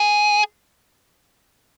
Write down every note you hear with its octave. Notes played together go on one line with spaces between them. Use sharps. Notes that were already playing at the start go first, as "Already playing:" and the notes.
Already playing: G#4